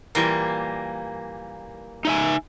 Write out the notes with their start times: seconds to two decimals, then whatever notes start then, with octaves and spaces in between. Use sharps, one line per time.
0.15 A#2 E3 G3 A#3
2.05 D#4 E5 G#5